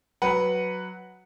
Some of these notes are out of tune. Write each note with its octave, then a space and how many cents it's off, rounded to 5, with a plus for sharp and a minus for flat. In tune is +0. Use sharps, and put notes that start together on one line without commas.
F#3 +0 B4 +0 F#5 +0